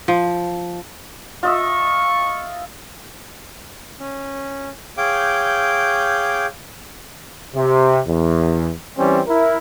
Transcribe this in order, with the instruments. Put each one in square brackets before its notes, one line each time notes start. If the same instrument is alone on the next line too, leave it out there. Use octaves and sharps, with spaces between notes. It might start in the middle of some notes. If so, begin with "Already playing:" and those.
[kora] F3
[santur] F4 D#5 E5 [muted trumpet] C#6
[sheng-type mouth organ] C#4
G#4 C#5 F5 G5 D6 G6
[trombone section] C3
E2
E3 G3 C4 C#4
E4 A#4